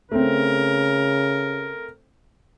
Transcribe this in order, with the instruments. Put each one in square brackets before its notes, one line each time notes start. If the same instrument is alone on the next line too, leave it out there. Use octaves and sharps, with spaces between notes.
[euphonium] C#3 [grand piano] A3 C4 [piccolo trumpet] A#4